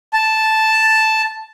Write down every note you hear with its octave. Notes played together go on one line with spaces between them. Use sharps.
A5